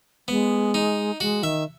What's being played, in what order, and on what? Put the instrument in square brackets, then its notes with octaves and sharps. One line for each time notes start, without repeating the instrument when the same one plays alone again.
[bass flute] G#3 [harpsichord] B3
[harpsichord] D#4
[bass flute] G#3 [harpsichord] F#4
[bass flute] D#3 [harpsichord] E5